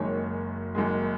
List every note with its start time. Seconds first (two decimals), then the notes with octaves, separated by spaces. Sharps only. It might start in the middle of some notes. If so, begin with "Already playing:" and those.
Already playing: F#1 F#2 D#3 G#3 C#5
0.75 F#1 F#2 D#3 G#3